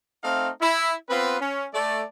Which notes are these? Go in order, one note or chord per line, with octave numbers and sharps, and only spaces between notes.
A3 C4 D#4 F5
E4
B3 C4 F4 B4
C#4
A3 D5